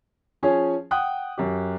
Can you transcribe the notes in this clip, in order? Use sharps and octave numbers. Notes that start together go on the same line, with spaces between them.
F3 C#4 G#4 C#5
F#5 G5 D#6 F#6
F#2 G4